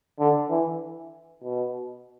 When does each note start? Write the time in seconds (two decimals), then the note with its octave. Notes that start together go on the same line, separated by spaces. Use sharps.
0.19 D3
0.50 E3
1.44 B2